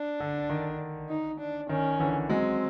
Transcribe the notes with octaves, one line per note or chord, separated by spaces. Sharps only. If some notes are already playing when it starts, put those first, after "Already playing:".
Already playing: D4
D3
D#3
D#4
D4
D#3 C#4
D3 E3
F#3 G#3 C4